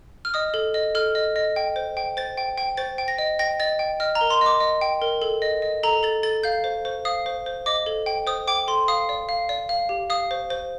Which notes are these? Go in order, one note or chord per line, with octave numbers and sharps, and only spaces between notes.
F6
D#5 D#6
A4
D#5
A4 F6
D#5
D#5
G5
C5
G5
C5 A6
G5
G5
C5 A6
G5
A#6
D#5
G5 A#6
D#5 A6
G5
D#5 F6
A#5
A#4
C6
D#5 D6
D#5
G5
A#4
A4
D#5
D#5
A4 A#5
A4 A6
A4 A6
F5 G6
C5
C5
F5 D#6
C5
C5
D#5 D6
A4
G5
C5 D#6
G5 D6
A4 C6
F5 D#6
D5
F5
D5
F5
G4
F5 D#6
C5
C5